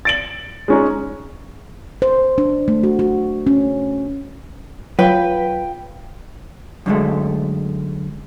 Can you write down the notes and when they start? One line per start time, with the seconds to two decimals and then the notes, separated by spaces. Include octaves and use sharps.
0.05 A6 D7 F#7
0.68 G#3 C#4 D#4
2.02 C5
2.38 D4
2.68 A3
2.83 F#4
2.99 F#4
3.47 C#4
4.99 F#3 F4 B4 F5 G5
6.86 F#2 D3 F3 G#3 A3